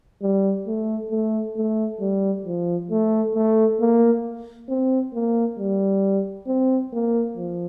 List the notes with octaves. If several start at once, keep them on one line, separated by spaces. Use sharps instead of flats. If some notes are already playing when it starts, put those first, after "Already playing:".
G3
A3
A3
A3
G3
F3
A3
A3
A#3
C4
A#3
G3
C4
A#3
F3